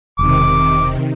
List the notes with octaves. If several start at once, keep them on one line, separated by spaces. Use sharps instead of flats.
E1 C3 D#3 D6